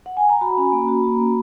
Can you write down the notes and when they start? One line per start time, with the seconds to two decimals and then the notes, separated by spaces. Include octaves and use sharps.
0.06 F#5
0.17 G#5
0.29 A#5
0.41 F#4 B5
0.58 C#4
0.72 A#3
0.88 F#4
1.03 F#4 A#5
1.20 A#3